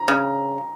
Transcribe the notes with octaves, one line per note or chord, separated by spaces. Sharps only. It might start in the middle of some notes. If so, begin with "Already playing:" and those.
Already playing: A#5
C#3